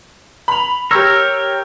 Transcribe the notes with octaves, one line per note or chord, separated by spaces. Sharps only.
B5 F7
G4 A#4 C#5 E6